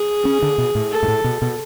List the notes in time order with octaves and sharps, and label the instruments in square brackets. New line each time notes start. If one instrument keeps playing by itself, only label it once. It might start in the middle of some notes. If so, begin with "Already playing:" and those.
Already playing: [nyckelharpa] G#4
[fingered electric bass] C#4
D3
B2
A2
[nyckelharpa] A4
[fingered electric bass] G#2
A2
B2
B2